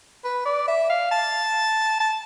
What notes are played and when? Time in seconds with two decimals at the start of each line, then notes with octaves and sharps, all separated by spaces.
0.24 B4
0.46 D5
0.68 E5
0.90 F5
1.12 A5
2.00 A5